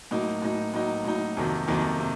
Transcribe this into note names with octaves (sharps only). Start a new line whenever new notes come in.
A2 F#3 A#3 D#4
A2 F#3 A#3 D#4
A2 F#3 A#3 D#4
A2 F#3 A#3 D#4
F2 C3 D#3 F#3 A#3
F2 C3 D#3 F#3 A#3
C3